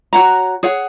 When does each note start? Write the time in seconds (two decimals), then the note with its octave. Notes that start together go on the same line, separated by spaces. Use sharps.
0.13 F#4 C#5 F#5 A#5
0.63 G#4 C#5 F#5